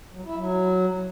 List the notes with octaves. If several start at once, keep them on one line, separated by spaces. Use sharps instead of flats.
F#3
E4
F#3